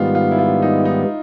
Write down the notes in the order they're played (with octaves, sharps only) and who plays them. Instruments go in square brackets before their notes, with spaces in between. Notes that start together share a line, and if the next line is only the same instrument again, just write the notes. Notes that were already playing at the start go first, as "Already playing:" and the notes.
Already playing: [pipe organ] G#2 D#3 G3 B3 [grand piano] F4
[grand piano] F4
E4
F4
D#4
D#4